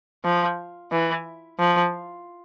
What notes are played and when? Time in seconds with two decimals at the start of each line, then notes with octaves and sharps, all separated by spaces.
0.24 F3
0.92 E3
1.59 F3